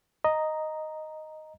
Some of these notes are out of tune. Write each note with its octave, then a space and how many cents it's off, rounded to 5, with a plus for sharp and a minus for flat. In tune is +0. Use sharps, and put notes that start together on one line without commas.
D#5 +0 A#5 +0